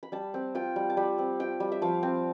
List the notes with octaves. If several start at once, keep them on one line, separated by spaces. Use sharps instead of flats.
B5
G3 A5
C4
F4 G5
G3
A5
G3 B5
C4
F4 G5
G3
E5
F3 F5
C4